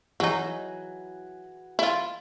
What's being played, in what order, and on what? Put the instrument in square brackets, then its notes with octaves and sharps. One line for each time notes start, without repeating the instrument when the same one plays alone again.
[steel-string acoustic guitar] E3 F#4 G#4 [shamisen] F#3 D#4
[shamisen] E4 F4